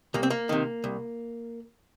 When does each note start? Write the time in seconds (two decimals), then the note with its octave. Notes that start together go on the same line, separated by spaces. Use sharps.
0.14 C2 A#3
0.23 C4
0.30 A#3
0.49 C3 D#3
0.84 C2